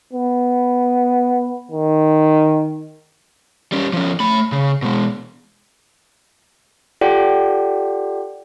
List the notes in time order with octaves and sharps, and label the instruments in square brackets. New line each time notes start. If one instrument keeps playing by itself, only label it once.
[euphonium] B3
D#3
[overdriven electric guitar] G3 C#4
F3 C#4
A3 B5
C#3
B2 G#3
[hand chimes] F4 G4 A4 D5 F#5 G5